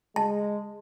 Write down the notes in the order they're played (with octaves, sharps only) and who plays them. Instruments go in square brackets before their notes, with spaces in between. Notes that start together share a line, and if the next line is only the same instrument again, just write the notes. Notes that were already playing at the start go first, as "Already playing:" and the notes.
[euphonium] G#3 [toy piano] A5